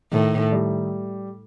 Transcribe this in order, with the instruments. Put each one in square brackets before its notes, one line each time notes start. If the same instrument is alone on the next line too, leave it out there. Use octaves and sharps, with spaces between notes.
[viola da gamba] A2 [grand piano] D#3
[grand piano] G3